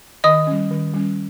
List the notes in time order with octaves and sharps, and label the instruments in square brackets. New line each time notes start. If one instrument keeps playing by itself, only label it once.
[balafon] D#3 [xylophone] D#5 D#6
[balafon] G3 C#4
D#3
G3 C#4